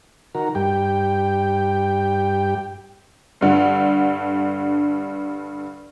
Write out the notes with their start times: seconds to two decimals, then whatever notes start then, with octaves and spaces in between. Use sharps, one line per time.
0.35 D#3 F#4 A#4
0.55 G2 G4 G5
3.41 G2 D3